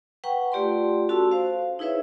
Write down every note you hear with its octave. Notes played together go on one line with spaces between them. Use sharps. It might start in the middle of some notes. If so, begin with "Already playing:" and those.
B4 F#5 G5 A#5 C#6
A3 F4 G4 D5 G5 C6
C#4 F#4 A4 A5 C6 E6
C5 F5
D#4 E4 G#4 B4 C#5 E5